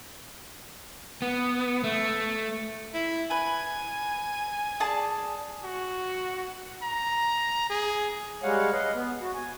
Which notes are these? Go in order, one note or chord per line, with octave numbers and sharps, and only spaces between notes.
B3
A3
E4
B4 G#5
G#4 D5 A5
F#4
A#5
G#4
G3 G#3 C#5 F5 F#5
B4 D#5 F5
B3
F#4
G#5